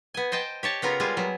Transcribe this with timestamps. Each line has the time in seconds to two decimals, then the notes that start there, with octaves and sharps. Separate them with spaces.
0.14 B3 G#5
0.32 C5 D#5 G5 A5
0.63 G4 C#5 A5
0.82 C#3 B3 F4 A#4
1.00 G3 G#3 F4 G#4
1.17 F#3 B3